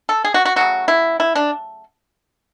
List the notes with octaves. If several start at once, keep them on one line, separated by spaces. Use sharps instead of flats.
A4
G#4
F#4
F#4
C#3 F#3 A3 F#4
E4
E4
D4